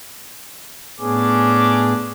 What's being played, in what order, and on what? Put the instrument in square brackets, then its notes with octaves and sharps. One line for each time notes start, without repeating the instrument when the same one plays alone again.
[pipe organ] A2 B3 G#4 [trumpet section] C#4 D4 D6